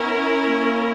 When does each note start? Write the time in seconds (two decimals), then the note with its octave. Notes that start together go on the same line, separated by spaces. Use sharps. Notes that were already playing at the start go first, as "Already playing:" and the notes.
Already playing: B3 C#4 E4 A#4
0.47 A#3